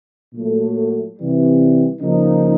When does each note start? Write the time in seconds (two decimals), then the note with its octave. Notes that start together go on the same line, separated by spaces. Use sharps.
0.34 A#2 F#3 A3
1.17 C3 E3 G3
2.01 C#3 F3 A#3 D#4